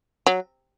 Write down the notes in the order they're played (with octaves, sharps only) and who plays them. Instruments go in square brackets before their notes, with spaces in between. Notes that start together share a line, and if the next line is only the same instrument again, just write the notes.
[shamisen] F#3